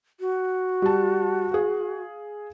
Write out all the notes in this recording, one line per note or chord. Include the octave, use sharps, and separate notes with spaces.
F#4
G3 A5
G#4 F5